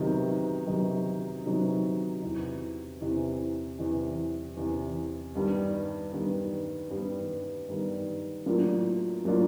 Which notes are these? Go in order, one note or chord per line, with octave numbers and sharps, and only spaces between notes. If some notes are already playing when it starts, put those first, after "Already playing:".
Already playing: C3 D#3 F#3 B3 D#4
C3 D#3 F#3 B3 D#4
C3 D#3 F#3 B3 D#4
E2 C3 E3
E2 C3 E3
E2 C3 E3
E2 C3 E3
G2 D#3 G3 B3
G2 D#3 G3 B3
G2 D#3 G3 B3
G2 D#3 G3 B3
A2 F#3 A#3 D4 F4
A2 F#3 A#3 D4 F4